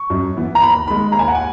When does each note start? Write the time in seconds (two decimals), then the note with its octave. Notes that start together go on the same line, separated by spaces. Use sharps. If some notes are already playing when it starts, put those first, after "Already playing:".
Already playing: C#6
0.10 F#2
0.37 E3 B3
0.55 A#5
0.62 D#2 B5
0.87 D#3 G#3 B5
1.12 D#2 A#5
1.19 G#5
1.28 F#5
1.35 G#5